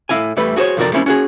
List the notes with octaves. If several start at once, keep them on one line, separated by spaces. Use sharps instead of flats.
A2 E4 F5 G#5
E2 E3 G3 A3 B4
F#4 G#4 A4 C5 C#5
F2 C3 D#3 F#4 A#4 D5
G3 A#3 C4 C#4 D#4 E4
C#4 F#4 G#4